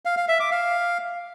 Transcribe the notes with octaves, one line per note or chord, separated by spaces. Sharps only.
F5
F5
E5
D6
F5